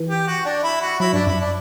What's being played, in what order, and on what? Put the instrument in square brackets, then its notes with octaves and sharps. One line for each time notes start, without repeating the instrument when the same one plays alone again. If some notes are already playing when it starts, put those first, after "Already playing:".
Already playing: [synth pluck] E3
[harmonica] G4
F#4
D4
E4
F#4
[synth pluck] F#3 [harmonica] E4
[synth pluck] G2 [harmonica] D4
[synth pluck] F#2 [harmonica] E4
[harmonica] D4